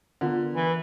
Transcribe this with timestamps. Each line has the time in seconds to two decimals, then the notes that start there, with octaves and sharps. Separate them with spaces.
0.21 D3 B3 F4 A#4
0.55 E3